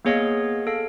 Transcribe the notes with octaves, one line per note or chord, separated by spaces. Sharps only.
A#3 B3 G#4 C#5 D#5 F5
A4 F5